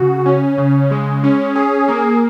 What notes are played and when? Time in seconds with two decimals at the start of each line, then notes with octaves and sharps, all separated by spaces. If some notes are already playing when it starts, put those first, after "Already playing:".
Already playing: C#3 F#4
0.26 C#4
0.58 C#3
0.91 G#3
1.24 C#4
1.55 G#4
1.88 A#3